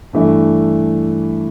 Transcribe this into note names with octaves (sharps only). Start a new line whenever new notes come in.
G2 E3 A3